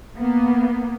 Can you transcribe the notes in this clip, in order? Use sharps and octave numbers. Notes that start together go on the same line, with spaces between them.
A#3 B3